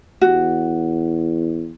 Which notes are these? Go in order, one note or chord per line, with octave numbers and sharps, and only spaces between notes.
E2 F#4